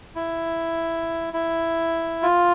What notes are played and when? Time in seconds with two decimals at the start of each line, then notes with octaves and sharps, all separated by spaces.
0.15 E4
1.34 E4
2.22 F4